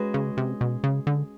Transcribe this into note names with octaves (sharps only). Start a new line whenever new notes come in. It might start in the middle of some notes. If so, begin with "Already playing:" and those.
Already playing: G#3 C#4 F#4 B4
C#3
C3
B2
C#3
D3